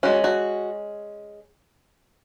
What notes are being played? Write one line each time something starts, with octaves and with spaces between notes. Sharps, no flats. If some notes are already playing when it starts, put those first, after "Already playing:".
G#3 C#4 F#4
F#4